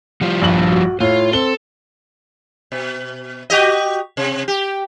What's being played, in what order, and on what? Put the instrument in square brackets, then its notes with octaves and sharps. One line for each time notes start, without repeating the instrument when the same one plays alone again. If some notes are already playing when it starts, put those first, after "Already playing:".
[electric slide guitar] F3 G3 F4
[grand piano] A#1 G2 F#7
[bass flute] F#4
[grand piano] A2 [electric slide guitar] F4 [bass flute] C#5
[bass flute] C4 [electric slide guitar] A4 [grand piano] G7
[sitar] B2
F#4 G4 D#5
C3
G4